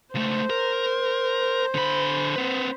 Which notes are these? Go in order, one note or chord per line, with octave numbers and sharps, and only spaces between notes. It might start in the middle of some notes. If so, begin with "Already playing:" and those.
C#2 A3 C5
A#4
D3 B5
C4 B4